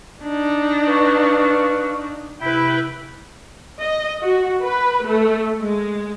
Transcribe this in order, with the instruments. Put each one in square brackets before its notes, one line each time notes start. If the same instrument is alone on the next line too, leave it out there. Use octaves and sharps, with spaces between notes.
[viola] D4 D#4
[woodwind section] B4 F5 C#6
[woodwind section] C3 E4 [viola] B4 G5
[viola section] D#5
F#4
B4
A3
G#3